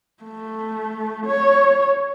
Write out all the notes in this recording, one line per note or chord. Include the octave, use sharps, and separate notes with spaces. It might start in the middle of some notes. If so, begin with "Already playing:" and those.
A3
C#5